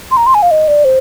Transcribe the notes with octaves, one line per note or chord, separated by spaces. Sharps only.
C6
A#5
C6
G#5
F5
D#5
D5
C5